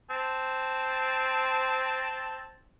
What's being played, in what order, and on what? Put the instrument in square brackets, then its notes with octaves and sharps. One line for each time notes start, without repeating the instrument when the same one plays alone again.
[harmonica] C4 A5